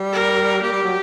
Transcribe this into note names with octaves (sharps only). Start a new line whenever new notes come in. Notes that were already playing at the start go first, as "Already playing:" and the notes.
Already playing: G3
A#4
A#3 G4
G3
F#3